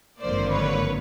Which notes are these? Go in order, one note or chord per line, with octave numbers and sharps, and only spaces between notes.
G#1 G2 D3 F3 A#3 C5 D5
B4 C#5